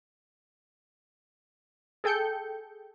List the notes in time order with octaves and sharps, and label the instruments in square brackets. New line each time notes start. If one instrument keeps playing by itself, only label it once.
[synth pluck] G#4 A4 G5 G6 C#7